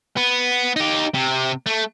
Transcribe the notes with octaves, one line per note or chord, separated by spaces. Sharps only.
B3
D#4 G4
C3
A3